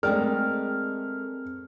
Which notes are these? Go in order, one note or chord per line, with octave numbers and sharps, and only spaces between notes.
G#3 A3 C4 G#4 A#4 D5 G5 F6